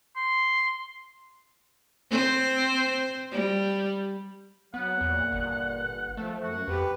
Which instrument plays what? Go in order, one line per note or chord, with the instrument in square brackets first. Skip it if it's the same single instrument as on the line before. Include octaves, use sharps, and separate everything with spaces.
[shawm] C6
[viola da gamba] C4 C5
G3
[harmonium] F#3 [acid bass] B3 [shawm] F#5
[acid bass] E2 [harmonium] A#2
[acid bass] G1
[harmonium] F3 [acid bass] A3
[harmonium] F#2 [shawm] F#4
[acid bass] F2 [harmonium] G4 B4